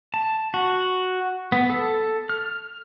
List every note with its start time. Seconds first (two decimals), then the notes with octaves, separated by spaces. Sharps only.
0.14 A5
0.54 F#4
1.52 B3
1.70 A4
2.29 F6